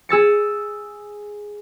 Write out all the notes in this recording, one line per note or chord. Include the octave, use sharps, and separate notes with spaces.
G#4 E6 A6 C#7